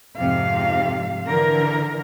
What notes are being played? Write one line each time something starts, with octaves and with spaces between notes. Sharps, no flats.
F2 G#2 C3 F5
D3 E3 A#4